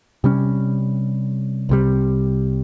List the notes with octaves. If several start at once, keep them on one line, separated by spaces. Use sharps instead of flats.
C3 G3 C#4
C2 C3 G3